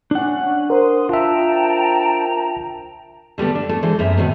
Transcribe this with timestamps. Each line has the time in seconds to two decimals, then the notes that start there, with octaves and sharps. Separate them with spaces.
0.11 C#4 D4 F#5
0.70 A#4 C5 C6 D#6
1.09 F4 E5 G5 A5 A#5
3.38 D3 G3 A3 B3
3.55 D4
3.69 A3
3.83 E3 G#3 A4 C5
3.99 F#2 B3 E5 A#5
4.17 A2 D#3 F#3 B3